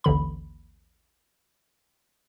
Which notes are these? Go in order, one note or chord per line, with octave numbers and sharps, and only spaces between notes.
A1 D#2 D3 B5